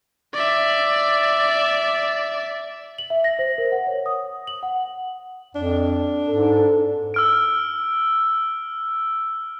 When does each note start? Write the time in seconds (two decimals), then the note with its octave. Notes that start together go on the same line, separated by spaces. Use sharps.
0.33 D5 E5
2.98 F#7
3.10 E5
3.24 A#6
3.39 C5
3.58 A#4
3.72 F#5
3.87 C#5
4.06 D#6
4.47 F#7
4.63 F#5
5.55 F2 D4
6.29 G#2 A4
7.14 E6 F6 D7